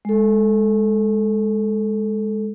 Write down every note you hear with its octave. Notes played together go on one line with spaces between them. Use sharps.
G#3 A4